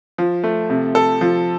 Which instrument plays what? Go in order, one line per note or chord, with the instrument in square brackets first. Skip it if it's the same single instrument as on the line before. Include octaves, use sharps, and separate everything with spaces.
[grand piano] F3
A3
C3
A4
F3